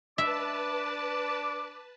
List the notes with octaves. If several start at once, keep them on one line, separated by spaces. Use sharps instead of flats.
D4 B4 E5 A5 D6